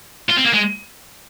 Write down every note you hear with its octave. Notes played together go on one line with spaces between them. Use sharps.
F4
C4
A#3
G#3